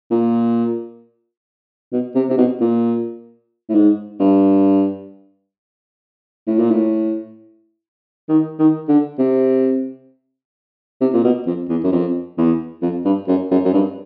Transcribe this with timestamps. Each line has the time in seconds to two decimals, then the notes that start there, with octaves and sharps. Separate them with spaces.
0.11 A#2
1.92 B2
2.15 C3
2.29 C3
2.38 B2
2.61 A#2
3.69 A2
3.75 G#2
4.20 G2
6.47 A2
6.59 A#2
6.70 A2
8.29 D#3
8.59 D#3
8.88 D3
9.19 C3
11.01 C3
11.13 A#2
11.24 B2
11.46 F2
11.69 E2
11.84 F#2
11.92 F2
12.38 E2
12.82 F2
13.05 G2
13.28 F#2
13.51 F#2
13.65 F#2
13.74 G2